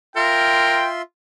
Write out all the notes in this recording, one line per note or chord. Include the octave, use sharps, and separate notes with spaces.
F4 A#4 E5 G5 C6